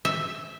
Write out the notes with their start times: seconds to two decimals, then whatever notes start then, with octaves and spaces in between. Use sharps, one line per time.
0.05 E5